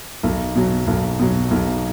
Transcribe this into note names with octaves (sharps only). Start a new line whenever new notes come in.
B1
B2 F#3
B1
B2 F#3
B1